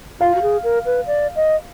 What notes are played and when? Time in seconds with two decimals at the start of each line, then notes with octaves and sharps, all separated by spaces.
0.21 F4 F5
0.35 F#4
0.42 G#4
0.64 A#4
0.86 B4
1.07 D5
1.36 D#5